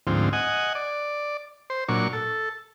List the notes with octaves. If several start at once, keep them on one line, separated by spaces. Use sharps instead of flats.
D2 G#2 F3 C4
D#5 F#5 G#5
D5
C5
A#2 F#3 D4 C#6
A4